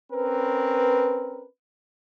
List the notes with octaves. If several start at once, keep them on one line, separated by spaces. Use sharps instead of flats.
C4 C#4 A#4 B4